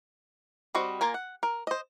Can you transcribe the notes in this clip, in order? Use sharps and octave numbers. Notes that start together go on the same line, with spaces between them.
G3 C4 F#4 D#5
A#3 F4 A#4 G#5
F#5
A#4
C5 D#5